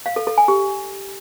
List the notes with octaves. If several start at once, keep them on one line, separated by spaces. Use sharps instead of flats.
F5
A4
A4
G#5
G4